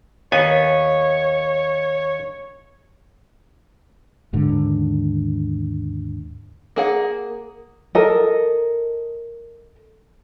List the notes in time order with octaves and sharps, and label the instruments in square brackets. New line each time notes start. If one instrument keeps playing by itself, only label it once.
[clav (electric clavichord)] D#2 B3 G#5 [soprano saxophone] C#5
[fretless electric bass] D#2 G#2 D3 D#3
[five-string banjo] A#3 G#4 F#5
[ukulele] A4 A#4 D#5